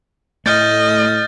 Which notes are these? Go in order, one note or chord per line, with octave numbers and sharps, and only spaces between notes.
A2 A3 D#5 F6 G6 A6